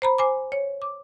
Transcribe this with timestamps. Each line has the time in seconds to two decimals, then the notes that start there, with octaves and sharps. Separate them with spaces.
0.02 C5 A#5 B5
0.18 C5 G#5 D6
0.52 C#5
0.82 D6